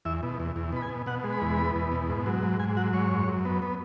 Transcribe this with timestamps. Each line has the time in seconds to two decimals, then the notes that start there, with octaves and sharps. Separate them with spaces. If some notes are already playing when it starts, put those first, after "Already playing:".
0.05 E2 E5
0.23 B2
0.40 E2
0.56 E2
0.72 B2 B5
0.82 G#5
0.89 B2
1.06 B2 F#5
1.24 G#3
1.33 B5
1.41 E2
1.58 B3
1.75 E2
1.92 B2
2.09 G#2
2.26 F#3
2.43 G#2
2.59 G#2 G#5
2.77 F#3 F#5
2.93 G#2 C#5
3.11 F#2
3.28 F#2
3.45 B3
3.62 B3